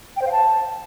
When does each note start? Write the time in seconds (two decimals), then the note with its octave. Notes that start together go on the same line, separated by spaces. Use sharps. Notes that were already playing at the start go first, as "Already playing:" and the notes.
0.16 G5
0.22 C5
0.27 F5
0.32 A5